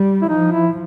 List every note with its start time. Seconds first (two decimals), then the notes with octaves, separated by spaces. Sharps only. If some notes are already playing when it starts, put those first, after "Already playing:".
Already playing: G3
0.22 E4
0.29 F3 D#4
0.52 E4